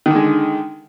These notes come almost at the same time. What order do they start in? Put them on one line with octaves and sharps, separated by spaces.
D#3 D3 G#3